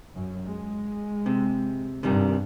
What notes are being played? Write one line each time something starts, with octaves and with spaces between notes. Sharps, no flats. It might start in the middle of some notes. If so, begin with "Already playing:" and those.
F#2
G#3
C3
G2 C3 D#3 G3